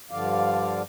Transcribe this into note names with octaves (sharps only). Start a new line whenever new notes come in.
G2 D3 F3 D5 F5